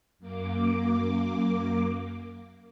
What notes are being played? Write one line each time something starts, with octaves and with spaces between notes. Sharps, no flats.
F#2 A#3 D6